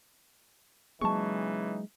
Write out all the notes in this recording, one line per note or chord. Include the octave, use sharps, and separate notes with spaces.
C#3 E3 F#3 G#3 A#3 D#4 A5 C#6